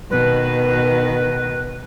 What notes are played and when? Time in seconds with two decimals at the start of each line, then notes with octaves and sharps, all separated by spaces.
0.11 B2 D#3 B4